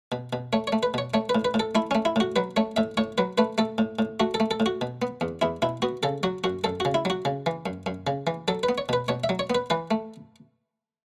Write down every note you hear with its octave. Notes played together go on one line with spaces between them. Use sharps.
B2
B2
A3 C#5
C#5
A3
B4
B2 C#5
A3 C#5
B4
A2
B4
A2
A4
A3 E4
A3 C#4
E4
A2 F#4
F#3 B4
A3 C#5
A2 E5
A2 C#5
F#3 B4
A3 B4
A3 A4
A2
A2
A3 F#4
A4
A3
A4
A2
F#4
B2
B3
E2
E2 E4
B2 E4
B3 F#4
C#3 A4
F#3 F#4
F#2 F#4
F#2 A4
C#3 F#4
E4
F#3 F#4
C#3
E3
F#2
F#2
C#3
E3
F#3 A4
B4
B3
C#5
B2 B4
B2 C#5
E5
F#3
C#5
B3 B4
E3 B4
A3